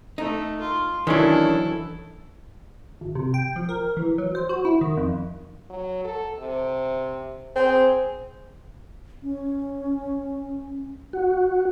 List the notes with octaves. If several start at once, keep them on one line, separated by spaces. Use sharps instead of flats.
A3 D#4
F4
D#3 E3 F#3 C#4 D4 E4 A4
G#1
C3
G5
F3
A#4
E3
F#3
C5
F#4
E4
D#3
F2
F#3
A4
C3
C4 G#4
C#4
F#4